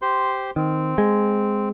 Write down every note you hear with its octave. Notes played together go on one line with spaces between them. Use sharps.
G4 C5 C6
D#3 C4
G#3